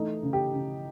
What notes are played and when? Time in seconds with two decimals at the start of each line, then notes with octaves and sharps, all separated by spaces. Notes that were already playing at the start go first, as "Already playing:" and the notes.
Already playing: E3 A3 D#4
0.23 C#3
0.33 G4
0.53 C#3